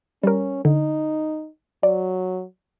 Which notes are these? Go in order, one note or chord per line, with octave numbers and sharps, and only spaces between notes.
G3 C#4 A#4
D3 D#4
F#3 D5